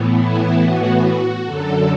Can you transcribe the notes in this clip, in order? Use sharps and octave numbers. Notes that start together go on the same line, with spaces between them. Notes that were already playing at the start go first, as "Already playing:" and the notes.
Already playing: A2 E3 B3
E4
F#4
F#4
F#2 D3 F#3 A4